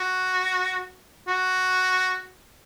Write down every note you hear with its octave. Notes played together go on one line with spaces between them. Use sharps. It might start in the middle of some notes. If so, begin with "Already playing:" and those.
Already playing: F#4
F#4